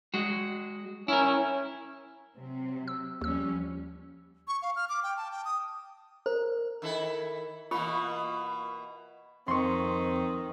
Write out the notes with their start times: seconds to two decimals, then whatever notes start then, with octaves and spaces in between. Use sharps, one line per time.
0.14 G#3 F#4
1.08 C#4 E4 A#4
2.35 C3 F#3 C4
2.88 E6
3.21 D#2 F3 G3 C#4 E6
4.48 C#6
4.62 F5
4.76 F6
4.89 D6
5.03 G5
5.17 A5
5.32 G5
5.45 D#6
6.26 A#4 C5
6.82 D#3 E4 A4
7.71 B2 E3 A#3 F4 B5 C#6
9.48 F2 D#3 C4 C6 C#6